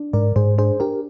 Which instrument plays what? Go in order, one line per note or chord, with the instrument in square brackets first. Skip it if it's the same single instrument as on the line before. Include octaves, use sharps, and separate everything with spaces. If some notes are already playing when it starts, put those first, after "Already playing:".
Already playing: [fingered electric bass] D4
[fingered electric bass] G#2 [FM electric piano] A#4 D5
[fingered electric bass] G#2 [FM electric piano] G#4 C5
[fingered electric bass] D4 [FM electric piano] G#4 C5
[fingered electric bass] D4 [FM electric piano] G4 A#4